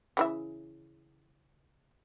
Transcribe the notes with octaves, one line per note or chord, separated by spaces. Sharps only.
C#3 E3 E5